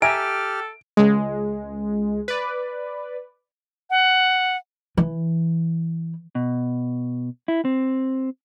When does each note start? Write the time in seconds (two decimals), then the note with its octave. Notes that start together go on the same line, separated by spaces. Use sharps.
0.02 G4 A4 E5 G#5 A#5 F6 D7
0.97 C#2 G#3
2.28 B4 D5
3.90 F#5
4.97 E3
6.35 B2
7.48 E4
7.65 C4